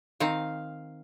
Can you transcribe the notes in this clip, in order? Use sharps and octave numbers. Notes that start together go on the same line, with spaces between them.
D#3 C4 D#4 F5